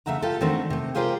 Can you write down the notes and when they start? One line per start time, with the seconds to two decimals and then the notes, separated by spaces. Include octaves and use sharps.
0.06 C#3 A3 E5 F#5 A#5
0.22 F4 G4 A4
0.41 D#3 A3 C4 D4 F#4
0.70 C3 A3
0.95 F4 G4 G#4 A#4 C5 D5